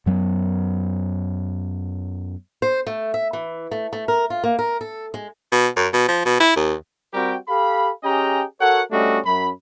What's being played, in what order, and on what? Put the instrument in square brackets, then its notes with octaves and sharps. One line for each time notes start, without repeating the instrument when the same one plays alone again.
[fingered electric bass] F#2 F#3 G#3 B3
[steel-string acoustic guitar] C5
A3
E5
E3
A3
A3
A#4
F4
A#3
A#4
A4
G#3
[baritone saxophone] B2
F#2
B2
F3
B2
E4
D#2
[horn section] G3 C4 F#4 G4 A#4 G5
G4 A4 F5 B5
C#4 G4 G#4 D#5 G5 A#5
F#4 A4 A#4 C#5 F#5
G3 A3 C#4 D4 F#4 D#5
F#2 B5